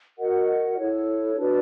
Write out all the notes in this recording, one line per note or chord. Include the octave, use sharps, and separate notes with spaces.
F#4 A#4 D#5 F#5
E4 A4 C#5
D4 F#4 B4 D5